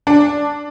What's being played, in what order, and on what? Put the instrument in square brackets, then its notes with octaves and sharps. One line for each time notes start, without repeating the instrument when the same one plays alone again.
[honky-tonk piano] D4